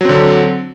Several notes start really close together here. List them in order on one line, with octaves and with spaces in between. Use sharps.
F#3 C4 D3